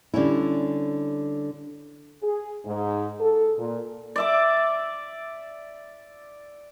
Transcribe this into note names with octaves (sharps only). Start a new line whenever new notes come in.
D3 G3 C#4 E4
G#4
G#2
A4
A#2
D5 E5 D6